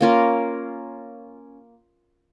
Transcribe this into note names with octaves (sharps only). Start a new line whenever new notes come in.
A#3 C#4 F4 A#4